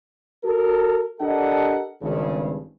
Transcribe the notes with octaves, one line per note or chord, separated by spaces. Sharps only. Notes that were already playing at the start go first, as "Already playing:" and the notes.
F#4 A4 A#4
D4 G4 A4 A#4 D#5 F#5
G#1 G2 C#3